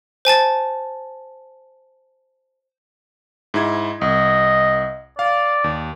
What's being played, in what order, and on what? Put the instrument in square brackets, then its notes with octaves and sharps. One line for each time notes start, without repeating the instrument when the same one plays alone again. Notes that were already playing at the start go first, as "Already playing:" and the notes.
[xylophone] C5 G#5 A5 A6
[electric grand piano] G#2 E4 G#6
[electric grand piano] C2 [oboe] D#5
[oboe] D5 [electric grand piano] F5
[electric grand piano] D#2